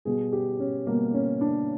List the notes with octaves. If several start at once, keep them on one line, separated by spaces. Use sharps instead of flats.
B2 G3 G#4
G4
C#4
B2 G3 A#3
C#4
D4